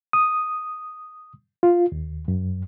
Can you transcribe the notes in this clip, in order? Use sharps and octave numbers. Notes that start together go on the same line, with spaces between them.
D#6
F4
D#2
F#2